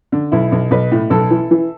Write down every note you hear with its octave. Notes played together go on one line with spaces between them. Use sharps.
D3
B1 E4
B1
B1 B4
A2
B1 A4
E3
E3